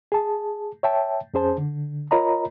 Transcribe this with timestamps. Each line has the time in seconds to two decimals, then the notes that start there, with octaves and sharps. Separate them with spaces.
0.12 G#4 A5
0.83 C#5 E5 G5 A5
1.34 F2 C#4 G#4 C5 A5
1.58 D3
2.11 F4 A#4 C#5 D#5 A#5 B5